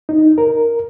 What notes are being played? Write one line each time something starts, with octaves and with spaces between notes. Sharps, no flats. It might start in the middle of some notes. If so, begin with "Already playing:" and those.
D#4
A#4